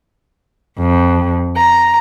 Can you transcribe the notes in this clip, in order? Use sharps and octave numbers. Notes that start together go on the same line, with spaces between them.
F2
A#5